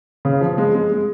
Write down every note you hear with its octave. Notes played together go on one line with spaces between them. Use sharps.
C#3
F3
G#3
G#3
G#3